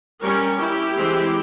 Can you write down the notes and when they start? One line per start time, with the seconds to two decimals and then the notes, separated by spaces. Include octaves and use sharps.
0.20 G3 C#4 A#4 C#5
0.58 E4 G4
0.94 E3 G#3 C4